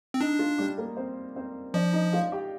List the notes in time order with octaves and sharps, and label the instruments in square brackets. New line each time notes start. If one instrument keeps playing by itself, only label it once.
[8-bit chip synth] C4
[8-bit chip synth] D4 [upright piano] D#4
[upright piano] F4
G3 G4
A#3 A#4
C4 C5
C4 C5
[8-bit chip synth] F3 [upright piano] D4 D5
[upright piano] D#4 D#5
F4 F5
G4 G5